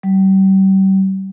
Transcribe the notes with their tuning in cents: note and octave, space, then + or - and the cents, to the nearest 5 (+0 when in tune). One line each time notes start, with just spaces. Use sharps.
G3 -35